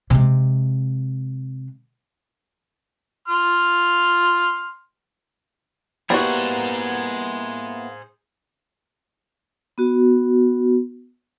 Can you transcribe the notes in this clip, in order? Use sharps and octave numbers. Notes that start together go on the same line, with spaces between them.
C3 G#3
C6 F6
G3 A#3 B3 E4 F#4 G#4 C5
B3 F#4